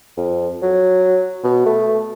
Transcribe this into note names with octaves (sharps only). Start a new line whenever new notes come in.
F2
F#3
B2
A3